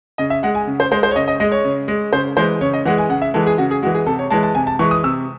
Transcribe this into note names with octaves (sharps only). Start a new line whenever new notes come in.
C#3 D#5
E5
G#3 F#5
G#5
C#3
C5
G#3 C5
C5
C#5
C#3 D#5
D#5
G#3 D#5
C#5
C#3
G#3
C#3 C5
E3 G#3 C5
C#3 C#5
D#5
E3 G#3 F#5
G#5
C#3 F#5
E5
E3 G#3 A4
G#4
C#3 F#4
G#4
E3 G#3 F#4
G#4
C3 A4
C#5
E3 G#3 A5
A5
C3 G#5
A5
E3 G#3 C#6
D#6
C3 E6